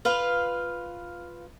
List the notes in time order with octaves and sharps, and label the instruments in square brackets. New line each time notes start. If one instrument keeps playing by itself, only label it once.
[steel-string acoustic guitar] F4 B4 F5